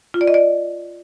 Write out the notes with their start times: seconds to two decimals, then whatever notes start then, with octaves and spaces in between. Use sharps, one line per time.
0.14 F4
0.21 D5
0.28 D#5
0.34 D5